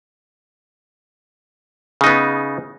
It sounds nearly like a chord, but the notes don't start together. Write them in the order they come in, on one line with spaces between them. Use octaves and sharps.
C#3 D#4 B3